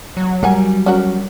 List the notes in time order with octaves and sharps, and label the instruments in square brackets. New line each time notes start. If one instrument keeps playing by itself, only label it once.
[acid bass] F#3
[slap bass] G3 [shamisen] A#4 F#5 G#5
[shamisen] C#4 F#4 A#4